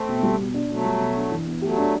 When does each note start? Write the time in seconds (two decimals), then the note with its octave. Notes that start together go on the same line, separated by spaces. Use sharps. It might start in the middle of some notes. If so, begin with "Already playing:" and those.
Already playing: A3 C4
0.08 B2
0.23 G3
0.39 B2
0.54 D4
0.70 B2 F#3 A3
0.85 G3
1.01 B2
1.17 D4
1.32 E3
1.47 B3
1.62 F#3 A3 G4
1.78 D4